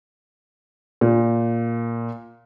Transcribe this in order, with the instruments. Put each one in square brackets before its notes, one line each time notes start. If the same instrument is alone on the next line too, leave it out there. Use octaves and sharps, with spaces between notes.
[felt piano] A#2